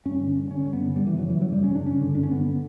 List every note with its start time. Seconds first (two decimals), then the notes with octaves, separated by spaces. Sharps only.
0.05 G2 C#4
0.20 D3
0.35 G2
0.50 D3 C#4
0.66 G2
0.73 B3
0.81 D3
0.96 F#2 G3
1.07 E3
1.11 C#3
1.18 F#3
1.26 F#2 E3
1.41 C#3 F#3
1.52 G3
1.56 F#2
1.64 C#4
1.71 C#3 D4
1.86 G2 C#4
2.01 D3
2.15 G2 D4
2.23 C#4
2.31 D3 B3